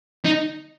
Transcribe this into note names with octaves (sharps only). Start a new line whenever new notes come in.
D#4